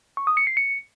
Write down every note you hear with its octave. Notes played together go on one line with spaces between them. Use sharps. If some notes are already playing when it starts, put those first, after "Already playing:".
C#6
D#6
C#7
C7
C#7